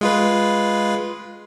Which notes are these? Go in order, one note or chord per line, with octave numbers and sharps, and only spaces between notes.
G#3 F4 B4